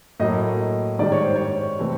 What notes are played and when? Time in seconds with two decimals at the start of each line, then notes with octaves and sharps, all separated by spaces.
0.20 A2 F#3 A#3 D#5
0.99 G#2 D#3 G3 D5
1.12 C#5
1.24 C5
1.36 C#5
1.79 C3 E3 A3 C4